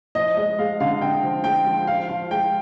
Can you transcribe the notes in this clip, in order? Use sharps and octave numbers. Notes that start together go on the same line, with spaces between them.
F3 D#5
G#3 D#5
G#3 F5
D3 F5
D3 G5
F3
G#3 G5
F3
F3 F5
F3 F5
G#3 G5